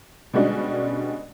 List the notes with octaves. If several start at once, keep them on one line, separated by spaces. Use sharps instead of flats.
B2 D3 G3 G#3 C#4 F#4